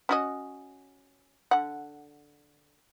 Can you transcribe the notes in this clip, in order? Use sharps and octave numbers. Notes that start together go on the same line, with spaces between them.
C#4 F#4 D#5
D3 F#5